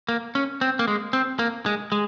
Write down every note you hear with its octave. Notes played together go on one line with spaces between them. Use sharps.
A#3
C#4
C4
A#3
G#3
C4
A#3
G#3
G#3